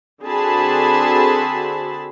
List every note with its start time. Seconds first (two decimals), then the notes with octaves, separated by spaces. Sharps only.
0.23 D3 C4 F#4 G#4 A5 B5